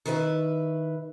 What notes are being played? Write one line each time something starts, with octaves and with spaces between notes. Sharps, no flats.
D#3 E4 B4 E5